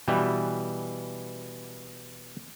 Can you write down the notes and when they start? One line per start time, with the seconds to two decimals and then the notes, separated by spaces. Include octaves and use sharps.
0.08 B2 E3 G3